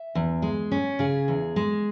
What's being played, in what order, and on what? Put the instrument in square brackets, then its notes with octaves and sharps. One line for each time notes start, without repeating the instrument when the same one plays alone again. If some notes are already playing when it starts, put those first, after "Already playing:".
Already playing: [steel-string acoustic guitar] E5
E2
G#3
C#4
C#3 G#4
E2
G#3